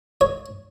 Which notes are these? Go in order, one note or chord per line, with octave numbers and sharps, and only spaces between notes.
C#5